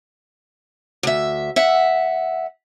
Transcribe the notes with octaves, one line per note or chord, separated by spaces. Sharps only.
D2 E5
E5 F#5